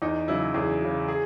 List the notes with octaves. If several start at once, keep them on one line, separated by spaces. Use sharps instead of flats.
E2 D#4
C#3 F#3 E4
E2 G#4
C#3 F#3
G#4